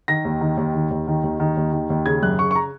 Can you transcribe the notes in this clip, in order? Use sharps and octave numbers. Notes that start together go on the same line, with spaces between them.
D#3 A#6
D#2
D#3
D#2
D#3
D#2
D#3
D#2
D#3
D#2
D#3
D#2
C#3 G#6
F#2 F#6
C#3 C#6
C#6
A#5